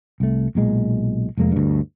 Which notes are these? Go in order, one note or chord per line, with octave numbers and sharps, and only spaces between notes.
C2 A3
B1 A#2 G#3
F1 F2 G#3 A#3
D2 G2